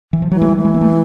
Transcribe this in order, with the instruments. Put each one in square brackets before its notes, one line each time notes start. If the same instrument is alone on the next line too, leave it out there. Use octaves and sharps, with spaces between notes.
[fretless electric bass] E3
F3
[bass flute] E3 [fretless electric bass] F#3
[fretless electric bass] G#3
G3
[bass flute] E3
[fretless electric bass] G#3
A#3
A3